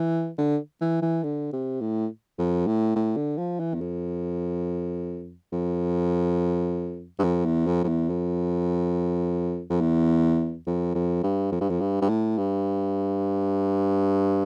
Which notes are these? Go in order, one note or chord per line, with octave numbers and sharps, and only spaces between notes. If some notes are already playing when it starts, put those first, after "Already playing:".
Already playing: E3
D3
E3
E3
D3
C3
A2
F2
A2
A2
D3
F3
E3
E2
F2
F2
G2
F2
E2
F2
F2
E2
F2
F2
E2
F2
F2
G2
F2
G2
F2
G2
G2
A2
G2